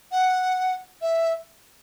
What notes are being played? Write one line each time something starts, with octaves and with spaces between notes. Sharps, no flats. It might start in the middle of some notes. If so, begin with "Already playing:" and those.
F#5
E5